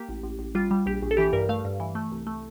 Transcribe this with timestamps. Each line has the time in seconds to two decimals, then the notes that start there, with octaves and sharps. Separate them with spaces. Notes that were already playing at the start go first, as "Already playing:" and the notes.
Already playing: A#3 G4
0.09 A1
0.23 A1
0.39 A1
0.55 G3 F4
0.71 G3
0.86 A#1 G4
1.02 A#1
1.11 A4
1.17 E3 G4
1.33 G2 A#4
1.49 A3 F5
1.65 G2
1.80 E3
1.95 A3
2.12 C2
2.27 A3